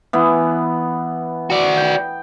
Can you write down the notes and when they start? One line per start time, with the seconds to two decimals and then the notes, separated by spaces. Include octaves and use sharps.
0.13 E3 B3
1.50 F#4 D5
1.77 G5